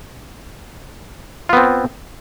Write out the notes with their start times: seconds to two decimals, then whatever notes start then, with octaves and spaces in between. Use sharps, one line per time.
1.49 F4
1.53 B3
1.57 C4